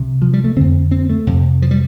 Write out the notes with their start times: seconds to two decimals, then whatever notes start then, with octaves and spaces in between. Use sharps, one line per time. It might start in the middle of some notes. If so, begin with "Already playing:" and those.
Already playing: C2 C3
0.22 F3
0.33 G3
0.44 A3
0.56 F2 D3 C4
0.91 C4
1.09 A3
1.27 F2 C3
1.62 F3
1.71 G3